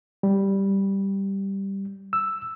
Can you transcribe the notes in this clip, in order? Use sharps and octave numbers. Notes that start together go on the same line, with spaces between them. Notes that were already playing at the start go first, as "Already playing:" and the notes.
G3
E6